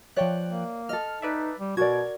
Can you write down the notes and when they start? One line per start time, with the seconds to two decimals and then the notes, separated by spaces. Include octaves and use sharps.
0.16 F3 C#5 D5 E5 G5 F#6
0.48 A#3
0.89 A4 D#5 F6
1.22 D#4 B4 D5 E5
1.60 G3
1.77 B2 F#4 A#4 D5 G#6